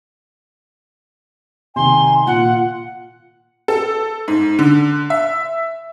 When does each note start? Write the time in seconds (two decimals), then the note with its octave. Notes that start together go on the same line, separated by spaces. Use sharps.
1.76 C3 D#3 G#5 C6
2.27 A#2 F4 F#5
3.68 A4
4.28 G#2
4.59 D3
5.10 E5